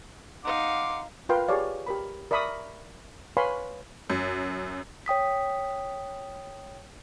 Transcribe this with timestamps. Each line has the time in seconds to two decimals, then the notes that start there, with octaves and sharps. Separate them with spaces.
0.45 D#4 F5 F#5 C6 D6
1.29 F4 A#4 B4 F5 G5 C6
1.48 G4 G#4 C#5 D5 F5
1.87 G4 A#4 B5
2.31 A#4 D5 E5 B5 C#6 D#6
3.37 B4 C#5 F5 G#5 B5 C6
4.10 F#2
5.06 C#5 G5 D#6 B6